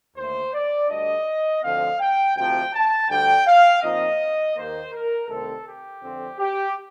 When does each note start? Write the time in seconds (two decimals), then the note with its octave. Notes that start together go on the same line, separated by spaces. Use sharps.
0.17 D#2 D3 A3 C5
0.54 D5
0.90 D2 D3 G3 D4 D#5
1.63 D2 D3 F3 C4 F5
2.00 G5
2.36 D2 C3 F3 G5
2.74 A5
3.09 D2 D3 G3 D4 G5
3.47 F5
3.83 A#2 F3 C4 D#4 D#5
4.56 D#2 D#3 A#3 C5
4.93 A#4
5.29 C2 C3 D#3 A3 C4 A4
5.66 G4
6.03 F2 D3 F3 C4
6.39 G4